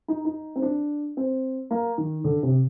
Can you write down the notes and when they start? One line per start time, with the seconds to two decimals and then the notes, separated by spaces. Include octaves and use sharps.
0.08 D#4
0.25 D#4
0.56 C4
0.62 D4
1.17 C4
1.71 A#3
1.98 D#3
2.24 D3
2.43 C3